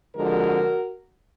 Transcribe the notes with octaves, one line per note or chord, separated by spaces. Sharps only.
F2 D3 F3 G#3 F#4 A#4